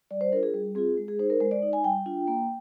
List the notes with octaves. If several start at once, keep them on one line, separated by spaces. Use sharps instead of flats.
G3 D5
C5
D4 F4 A#4
G#4
G3
C4 F4 G#4
G#3
G#4
D#4 C5
A#4
G#3 C5
D5
D#4
G#5
G3 G5
D4 F4
A#3